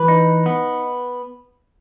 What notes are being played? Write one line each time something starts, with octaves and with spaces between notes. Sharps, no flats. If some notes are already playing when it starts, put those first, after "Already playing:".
Already playing: E3 B4
D#4
B3